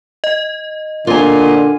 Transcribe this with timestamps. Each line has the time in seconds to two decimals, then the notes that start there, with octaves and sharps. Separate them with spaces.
0.24 D#5
1.07 A#2 D3 F4 G#5